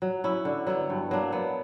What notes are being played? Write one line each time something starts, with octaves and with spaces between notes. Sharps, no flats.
F#3
C#4 E4
D3
F#3 B3 E4
G2
F#3 A#3 D4
B3